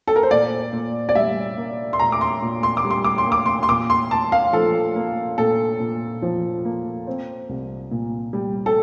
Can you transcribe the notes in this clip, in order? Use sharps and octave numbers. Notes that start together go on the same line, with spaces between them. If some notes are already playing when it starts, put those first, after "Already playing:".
A4
A#4
C5
A#2 D5
A#2
D5
G3 E5
A#3
C6
A#2 A#5
D6
C6
A#2
C6
D6
G3
C6
D6
C6
A#3
D6
C6
C6
A#2 D6
C6
A#2 A5
F5
F3 A4
A#3
A#2 A4
A#2
F3
A#3
C4
C2
A#2
G3
A4